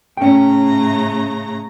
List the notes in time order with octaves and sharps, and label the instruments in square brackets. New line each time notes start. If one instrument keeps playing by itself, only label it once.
[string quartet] A2 C#3 A#5 [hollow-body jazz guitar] C#4 G5